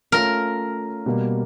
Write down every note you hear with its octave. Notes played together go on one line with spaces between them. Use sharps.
A3 C#4 F4 A#4
B2 G3 A#3